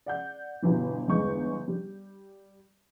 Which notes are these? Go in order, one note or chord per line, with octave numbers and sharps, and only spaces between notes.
D5 F#5 G6
G1 B2 E3 G3
G1 E2 G#3 C#6 G6
G3